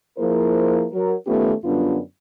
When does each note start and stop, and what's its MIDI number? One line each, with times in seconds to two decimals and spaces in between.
0.19 0.86 53
0.19 0.86 58
0.19 0.86 64
0.19 0.86 68
0.19 0.86 70
0.19 0.86 72
0.92 1.15 54
0.92 1.15 70
1.26 1.52 51
1.26 1.52 57
1.26 1.52 59
1.26 1.52 61
1.26 1.52 65
1.26 1.52 67
1.64 1.98 42
1.64 1.98 50
1.64 1.98 55
1.64 1.98 59
1.64 1.98 62
1.64 1.98 65